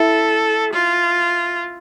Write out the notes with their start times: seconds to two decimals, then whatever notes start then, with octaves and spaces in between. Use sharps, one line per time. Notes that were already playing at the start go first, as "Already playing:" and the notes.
Already playing: E4 A4
0.73 F4